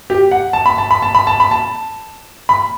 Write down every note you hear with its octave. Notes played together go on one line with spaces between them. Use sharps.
G4
F#5
A5
B5
A5
B5
A5
B5
A5
B5
A5
B5